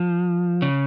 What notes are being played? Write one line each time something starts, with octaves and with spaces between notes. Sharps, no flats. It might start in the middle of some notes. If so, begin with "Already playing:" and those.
Already playing: F3
C#3